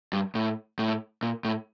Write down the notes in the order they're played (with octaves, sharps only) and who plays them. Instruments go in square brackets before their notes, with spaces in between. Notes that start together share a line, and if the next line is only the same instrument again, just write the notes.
[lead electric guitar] G2
A2
A2
A#2
A2